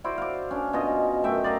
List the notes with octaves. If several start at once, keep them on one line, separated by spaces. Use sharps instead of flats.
E4 F#4 C5 D5
F5 D6
C#4 D4
B2 C#4 F4 D#5
F#2 A3 E5 G5
D5 D#5 F5 A#5